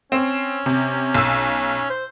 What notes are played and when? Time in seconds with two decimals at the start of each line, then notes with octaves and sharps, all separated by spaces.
0.12 C4 C#4
0.66 C3
1.15 B1 E6
1.90 C5